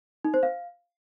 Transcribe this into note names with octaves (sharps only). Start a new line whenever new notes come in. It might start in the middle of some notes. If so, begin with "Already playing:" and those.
D#4
C5
F5